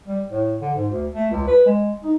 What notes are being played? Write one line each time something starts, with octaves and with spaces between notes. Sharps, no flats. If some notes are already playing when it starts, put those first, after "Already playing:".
G3
A2
D3
G#2
D2
A3
C#2
B4
G#3
D#4